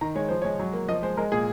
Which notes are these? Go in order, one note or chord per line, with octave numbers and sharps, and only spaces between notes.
D#3 A#5
G#3 C#5
F3 C5
G#3 C#5
F#3
A#3
F3 D#5
G#3 C5
G#3 A#4
A#2 G#4